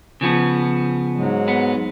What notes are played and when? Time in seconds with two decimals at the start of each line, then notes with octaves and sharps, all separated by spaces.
0.21 C#3 F3 B3
1.16 G#2 F#3 G#3
1.48 B3